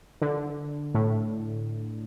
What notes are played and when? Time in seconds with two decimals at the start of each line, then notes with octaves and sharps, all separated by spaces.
0.22 D3
0.94 A2